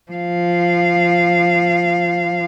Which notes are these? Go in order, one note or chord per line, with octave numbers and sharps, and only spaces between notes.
F3 F5